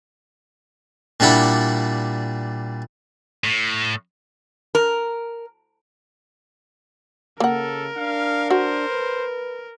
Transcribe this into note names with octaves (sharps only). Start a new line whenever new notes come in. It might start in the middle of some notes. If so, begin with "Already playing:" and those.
A#2 G3 D4 E4 F#5 B5
A2
A#4
C#3 A#3 A4 A#4 F#5
D4 F5
F#4 C5
B4